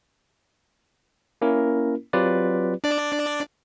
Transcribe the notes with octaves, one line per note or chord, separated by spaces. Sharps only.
A#3 C#4 E4 A#4
F#3 C4 F4 G4 B4 D5
D4 D5